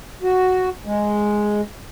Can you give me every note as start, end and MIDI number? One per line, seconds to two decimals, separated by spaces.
0.23 0.69 66
0.85 1.61 56